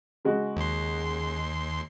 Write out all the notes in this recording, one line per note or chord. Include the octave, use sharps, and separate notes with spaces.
C#3 G#3 F#4
D#2 C6